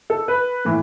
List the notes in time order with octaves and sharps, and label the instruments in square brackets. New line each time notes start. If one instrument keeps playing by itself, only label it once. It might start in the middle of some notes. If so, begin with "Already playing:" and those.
[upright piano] A4
B4
A2 E3